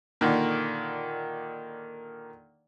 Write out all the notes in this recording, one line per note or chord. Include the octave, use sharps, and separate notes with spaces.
A#2 D3 D#3 A#3